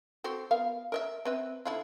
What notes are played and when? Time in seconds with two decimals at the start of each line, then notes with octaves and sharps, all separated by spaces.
0.24 C4 F#4 A4
0.51 B3 A#4 F5
0.92 A#4 D#5 E5
1.25 C4 B4 E5
1.65 D3 E4 F4